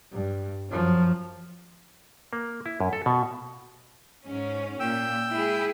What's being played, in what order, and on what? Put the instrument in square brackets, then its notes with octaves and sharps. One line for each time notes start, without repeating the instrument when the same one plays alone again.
[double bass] G2
F#2 F3
[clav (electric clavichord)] A#3
E4
F#2
A4
B2
[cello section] G#2 C#4
[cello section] A#2 [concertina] G5 E6
[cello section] G#3 E4 G#4